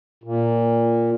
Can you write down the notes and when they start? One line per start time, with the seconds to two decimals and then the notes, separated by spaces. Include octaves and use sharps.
0.24 A#2